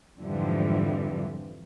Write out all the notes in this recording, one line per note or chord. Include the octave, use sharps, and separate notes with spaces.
F2 G#2 D3 E3 F3 G3